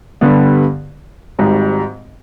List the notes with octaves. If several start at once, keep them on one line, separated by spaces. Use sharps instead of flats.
G2 D3 G3 B3
G#1 G#2 G3